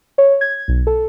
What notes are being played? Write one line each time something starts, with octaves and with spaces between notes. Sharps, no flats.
C#5
G#6
B1
A4